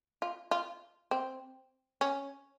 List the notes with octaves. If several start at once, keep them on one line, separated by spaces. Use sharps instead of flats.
F4
F4
C4
C#4